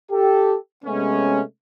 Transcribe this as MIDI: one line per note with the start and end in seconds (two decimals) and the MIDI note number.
0.11 0.56 67
0.11 0.56 69
0.84 1.41 48
0.84 1.41 56
0.84 1.41 57
0.84 1.41 59
0.84 1.41 61